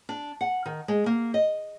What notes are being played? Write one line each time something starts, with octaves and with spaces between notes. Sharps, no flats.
D4
F#5
D#3
G#3
A#3
D#5